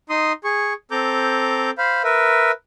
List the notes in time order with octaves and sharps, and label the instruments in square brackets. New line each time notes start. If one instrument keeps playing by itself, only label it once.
[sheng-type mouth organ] D#4 C6 D#6
G#4 C#6
C4 A4 A#5 D6 G6
C5 F5 B5
A#4 B4 E5